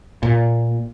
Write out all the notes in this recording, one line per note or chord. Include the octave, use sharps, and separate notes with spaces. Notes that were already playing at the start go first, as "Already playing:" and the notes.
A#2